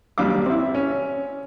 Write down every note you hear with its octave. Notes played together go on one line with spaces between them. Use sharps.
D#2 G3 D4 F5 D6
C4 E4
C#4